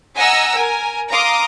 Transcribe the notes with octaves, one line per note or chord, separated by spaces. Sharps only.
D#5 F#5 G#5 A#5 E6 A#6
A#4 G#5
F5 A#5 C6 D6 D#6